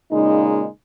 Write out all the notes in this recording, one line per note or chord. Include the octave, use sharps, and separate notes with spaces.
A#2 C#3 G#3 D#4